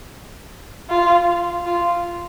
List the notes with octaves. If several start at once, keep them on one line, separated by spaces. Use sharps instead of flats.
F4
F4